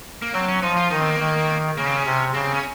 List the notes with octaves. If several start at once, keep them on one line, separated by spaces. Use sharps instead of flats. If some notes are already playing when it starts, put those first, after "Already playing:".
A#3
F#3 C4
C#4
F3 D#4
F4
D#3 D#4
C4
A#3
D#3
C#3 A#3
C4
C#4
C3
C#3 C4
C#4